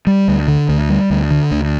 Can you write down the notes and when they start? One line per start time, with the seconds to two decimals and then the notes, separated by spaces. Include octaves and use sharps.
0.07 G3
0.28 D2
0.48 D3
0.69 D2
0.90 G3
1.10 D2
1.31 D3
1.51 D2